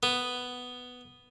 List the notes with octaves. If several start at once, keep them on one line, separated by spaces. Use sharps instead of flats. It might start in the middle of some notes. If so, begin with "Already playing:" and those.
B3